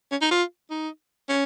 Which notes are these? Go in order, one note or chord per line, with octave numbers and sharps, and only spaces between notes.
C#4
D#4
F4
D#4
C#4